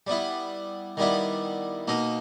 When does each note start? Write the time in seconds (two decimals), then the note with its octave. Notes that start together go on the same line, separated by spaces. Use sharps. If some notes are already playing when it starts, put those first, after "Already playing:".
0.07 G3 B3 E4
0.97 D#3 G3 B3 E4
1.88 B2 A#3 D#4